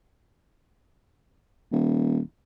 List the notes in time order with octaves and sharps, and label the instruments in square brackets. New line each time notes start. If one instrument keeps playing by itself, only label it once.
[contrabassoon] D#1